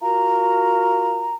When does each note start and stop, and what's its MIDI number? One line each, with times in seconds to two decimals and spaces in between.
0.02 1.35 65
0.02 1.35 66
0.02 1.35 70
0.02 1.35 82